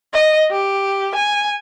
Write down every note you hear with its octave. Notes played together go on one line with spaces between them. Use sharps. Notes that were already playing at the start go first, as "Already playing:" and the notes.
D#5
G4
G#5